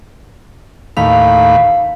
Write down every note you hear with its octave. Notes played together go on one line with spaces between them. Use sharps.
D#2 A2 F5 B5